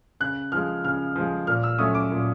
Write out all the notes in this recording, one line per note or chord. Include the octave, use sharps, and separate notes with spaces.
C#3 F#6
F3 G#3 F6
C#3 F6
F3 G#3
A#2 F6
E6
F#3 A3 C#4 D#6
D6
A#2